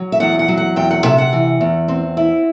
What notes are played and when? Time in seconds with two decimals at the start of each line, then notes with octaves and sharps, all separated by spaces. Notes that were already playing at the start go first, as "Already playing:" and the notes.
Already playing: F#3
0.12 E5
0.20 E2 F#5
0.39 F#5
0.48 F#3
0.57 F#5
0.76 E2 G5
0.91 F#5
1.05 C3 E5
1.18 F#5
1.33 E3
1.61 E2
1.88 C4
2.17 E4